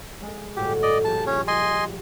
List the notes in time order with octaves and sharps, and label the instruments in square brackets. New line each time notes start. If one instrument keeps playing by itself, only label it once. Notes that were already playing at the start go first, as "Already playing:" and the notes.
[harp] G#3
[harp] G1 A2 F#4 [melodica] G4
[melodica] D5 D#5
[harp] A#1 G4 [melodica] A5
[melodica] C#4 C#5 [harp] F4
[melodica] D#5 G#5 C6